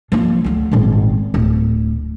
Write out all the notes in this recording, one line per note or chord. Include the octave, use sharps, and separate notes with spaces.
F3 A#3
D2 F#3
D#1 G#1
D1